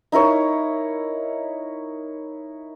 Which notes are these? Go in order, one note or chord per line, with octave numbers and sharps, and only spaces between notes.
D#4 E4 A#4 C#5